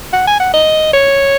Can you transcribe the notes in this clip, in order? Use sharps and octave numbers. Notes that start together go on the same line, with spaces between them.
F#5
G#5
F#5
D#5
C#5